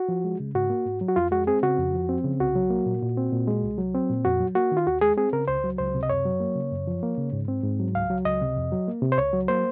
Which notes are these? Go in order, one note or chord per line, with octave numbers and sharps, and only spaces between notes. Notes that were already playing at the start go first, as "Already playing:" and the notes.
Already playing: F#4
F3
G#3
C#3
G#2 F#4
A#3
G#2
F#3
F#4
F2 F4
G#3 F#4
C4 G#4
C#3 F#4
F2
F3
C4
C#3
C2 F#4
F#3
A#3
A#2
A#2
C4
A#2
G#3
C2
F#3
C4
A#2
F2 F#4
F#3
A#3 F#4
D#3
F4
D#2 F#4
G#3 G#4
C4 G#4
C#3 A#4
C#2 C5
F#3
C#2 C5
C3
D#5
F#2 C#5
F#3
A#3
C#3
F#2
F3
A#3
C#3
G#2
C4
G#2
F#3
C#2 F5
F#3
C#2 D#5
C3
F2
F#3
A#3
C3
C5
C#2 C#5
F#3
A#3 C5